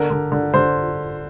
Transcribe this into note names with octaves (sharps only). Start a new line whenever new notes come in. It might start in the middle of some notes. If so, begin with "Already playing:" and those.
Already playing: D3 A#4
D3
D3
D3 C5